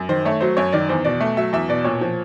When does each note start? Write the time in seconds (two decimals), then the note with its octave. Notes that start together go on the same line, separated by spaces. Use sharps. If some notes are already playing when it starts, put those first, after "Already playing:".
Already playing: F#2
0.09 D#3 C5
0.25 A3 C#5
0.41 F#3 C5
0.57 F#2 C#5
0.73 D#3 D5
0.89 E2 C5
1.05 B2 D5
1.20 A3
1.37 F#3 E5
1.53 E2 E5
1.69 B2 D5
1.84 A#2 C#5
2.01 F3